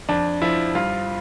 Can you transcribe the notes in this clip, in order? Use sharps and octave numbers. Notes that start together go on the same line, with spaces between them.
F2 D4
F3 E4
G2 F4